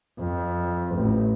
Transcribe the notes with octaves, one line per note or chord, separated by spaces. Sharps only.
F2
A1